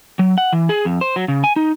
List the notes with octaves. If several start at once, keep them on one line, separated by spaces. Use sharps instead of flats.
F#3
F#5
E3
G#4
F2
C5
F#3
C#3
G#5
D#4